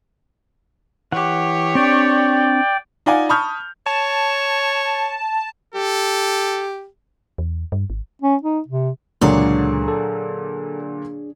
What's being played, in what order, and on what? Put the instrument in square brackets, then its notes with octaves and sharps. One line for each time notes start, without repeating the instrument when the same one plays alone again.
[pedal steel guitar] E3 F#5 [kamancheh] G4 C#5
[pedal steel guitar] C4 D4 [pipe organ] D5 G5
[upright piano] D#4 F4 D5 F5 F#5 G#5
A5 B5 C#6 D#6 F6 G6
[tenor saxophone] C#5 [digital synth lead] A5
[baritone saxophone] G4 [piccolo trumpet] A4
[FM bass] E2
G2
G#1
[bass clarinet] C#4
D#4
C3
[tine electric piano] C#2 [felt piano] A#2 D3 F#3 [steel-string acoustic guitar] D4 G#4 C#5
[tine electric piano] A4